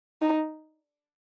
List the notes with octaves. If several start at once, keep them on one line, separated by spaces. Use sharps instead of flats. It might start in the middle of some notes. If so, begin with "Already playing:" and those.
D#4